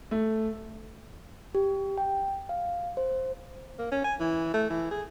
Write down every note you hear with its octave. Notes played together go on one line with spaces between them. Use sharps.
A3
G4
G5
F5
C5
A#3
C#4
G#5
E3
A3
E3
G#4